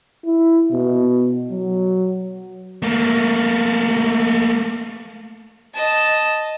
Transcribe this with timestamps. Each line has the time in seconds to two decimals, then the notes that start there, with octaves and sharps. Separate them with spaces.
0.25 E4
0.71 B2
1.51 F#3
2.82 A3 A#3
5.74 D#5 A5